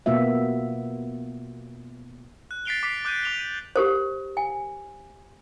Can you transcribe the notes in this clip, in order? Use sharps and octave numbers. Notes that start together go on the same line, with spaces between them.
B2 A#3 B3 F4 E5
F#6
A6 B6 C7 D7 F7 G7
D6 B6 C7 D7 F7
D6 F#6 G6 D7 D#7
D6 F7 G7
D#7 F#7
G4 A#4 C5
G#5